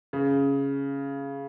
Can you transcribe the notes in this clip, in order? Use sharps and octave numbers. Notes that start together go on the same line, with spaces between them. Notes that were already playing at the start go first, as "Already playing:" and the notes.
C#3